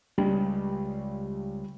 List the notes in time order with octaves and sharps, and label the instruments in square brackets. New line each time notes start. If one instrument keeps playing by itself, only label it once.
[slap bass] C#2 [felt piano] G3